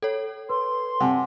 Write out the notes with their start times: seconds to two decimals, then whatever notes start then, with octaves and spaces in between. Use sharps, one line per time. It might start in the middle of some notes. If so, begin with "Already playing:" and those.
0.02 A4 C#5
0.49 B4 C6
1.00 C3 F#5 G#5 A5